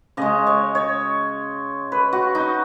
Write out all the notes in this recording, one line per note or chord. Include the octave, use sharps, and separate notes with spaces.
C#3 G#3 D#5
C#5
C#5
B4
F#4
D#4